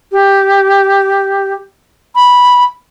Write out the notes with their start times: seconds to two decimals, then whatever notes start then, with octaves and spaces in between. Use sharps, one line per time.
0.12 G4
2.15 B5